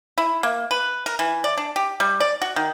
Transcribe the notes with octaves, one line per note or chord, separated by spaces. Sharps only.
E4
A#3
B4
A#4
E3
D5
D4
G4
G3
D5
F#4
D#3